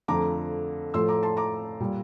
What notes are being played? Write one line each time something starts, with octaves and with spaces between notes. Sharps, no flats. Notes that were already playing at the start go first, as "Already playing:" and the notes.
F2 D3 F3 A3 A#5 D6
A2 F3 A3 C6 E6
A#5 D6
A5 C6
A#5 D6
A#2 G3